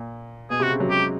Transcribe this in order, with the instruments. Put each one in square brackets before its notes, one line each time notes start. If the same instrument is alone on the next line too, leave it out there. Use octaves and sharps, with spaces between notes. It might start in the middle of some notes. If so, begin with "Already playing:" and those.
Already playing: [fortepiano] A#2
[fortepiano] B2 [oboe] G#4
[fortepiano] C3
[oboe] F#4
[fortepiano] C#3
F#3
[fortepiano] G#3 [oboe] G4